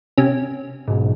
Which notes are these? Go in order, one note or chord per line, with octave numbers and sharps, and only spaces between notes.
C3 C#4
B1 G#2